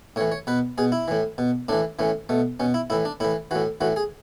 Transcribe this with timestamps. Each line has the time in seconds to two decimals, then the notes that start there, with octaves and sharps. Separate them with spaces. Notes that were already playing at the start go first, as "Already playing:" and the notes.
0.16 A2 C#5
0.21 E3
0.32 C#5
0.47 B2 B4
0.78 B2 G#4
0.92 E4
1.08 A2 E3
1.38 B2
1.69 A2 E3 D4
1.99 A2 E3 C#4
2.29 B2 A3
2.60 B2 C#4
2.74 E4
2.90 A2 E3 E4
3.05 D4
3.20 A2 E3 E4
3.51 A2 E3 F#4
3.81 A2 E3 F#4
3.96 G#4